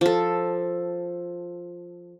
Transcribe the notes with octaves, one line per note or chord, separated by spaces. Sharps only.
F3 A4